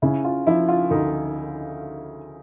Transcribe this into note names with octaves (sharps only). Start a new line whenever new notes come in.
C#3 E4
F4
F3 E4
F4
D2 D#4